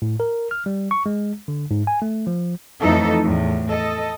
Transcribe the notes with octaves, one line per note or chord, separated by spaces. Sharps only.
A2
A#4
F6
G3
C#6
G#3
D3
G#2
G#5
A3
F3
F2 A2 E3 D#4 A4
E2 A2
A4 D#5